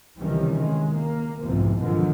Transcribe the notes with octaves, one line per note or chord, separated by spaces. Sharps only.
C#2 C3 D#3 E3 G3 C#4
G#3
A#3
B1 F2 G#2 C3 E3 F3
B2 D3 D#3 F3 F#3 G#3